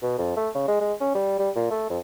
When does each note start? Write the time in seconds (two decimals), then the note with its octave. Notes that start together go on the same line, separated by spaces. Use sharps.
0.02 B2
0.18 F2
0.37 A3
0.55 C#3
0.68 G#3
0.81 G#3
1.00 C#4
1.15 G3
1.39 G3
1.56 A#2
1.71 A3
1.90 F2